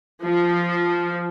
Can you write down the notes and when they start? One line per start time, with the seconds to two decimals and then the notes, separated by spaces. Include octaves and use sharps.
0.25 F3